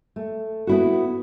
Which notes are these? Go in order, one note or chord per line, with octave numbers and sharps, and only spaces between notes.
A3
B3 E4 F#4